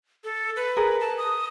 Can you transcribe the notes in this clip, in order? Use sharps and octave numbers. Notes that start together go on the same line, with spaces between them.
A4
B4
G#4 A#4
A5
D#6